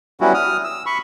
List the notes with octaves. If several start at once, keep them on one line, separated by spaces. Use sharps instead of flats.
F#3 G3 B3 C#4 E4 F#4
D#6 F6
E6
B5 C#6